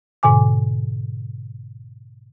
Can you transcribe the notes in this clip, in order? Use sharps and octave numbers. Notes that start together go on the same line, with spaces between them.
G#2 B2 D3 G#5 D6